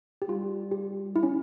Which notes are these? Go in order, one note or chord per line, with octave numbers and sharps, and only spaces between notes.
G4
G3 F4
G4
E4
C#4